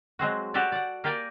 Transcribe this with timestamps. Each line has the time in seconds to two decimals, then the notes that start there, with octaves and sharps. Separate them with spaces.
0.19 F#3 G#3 C4 F#4
0.54 F#4 G4 A4 C#5 D5
0.72 D5 F#5
1.04 A#3 G4 A#4 D5 G5 G#5